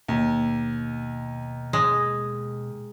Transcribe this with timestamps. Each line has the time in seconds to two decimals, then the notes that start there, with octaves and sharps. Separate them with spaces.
0.08 D#2 B2
1.73 G#3